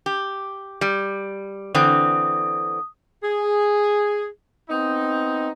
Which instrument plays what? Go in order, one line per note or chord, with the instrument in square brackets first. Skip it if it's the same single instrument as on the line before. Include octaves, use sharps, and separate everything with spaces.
[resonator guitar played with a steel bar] G4
G3
[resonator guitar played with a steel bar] D3 E3 C4 [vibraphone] D#6
[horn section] G#4
B3 C4 D#4